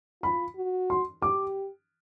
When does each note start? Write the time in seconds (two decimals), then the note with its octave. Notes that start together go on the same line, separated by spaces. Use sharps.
0.23 F4 B5
0.56 F#4
0.90 C6
1.22 G4 D6